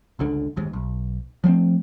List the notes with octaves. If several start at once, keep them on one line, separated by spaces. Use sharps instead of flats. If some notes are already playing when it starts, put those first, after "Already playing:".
G1 C#2 D3
G1 D#2 G#2
B1
F3 A3 A#3 C4